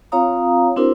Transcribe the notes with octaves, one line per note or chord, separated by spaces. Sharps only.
C4 F4 C#5 F5 A#5 D#6
C4 D4 E4 F#4 A#4 C5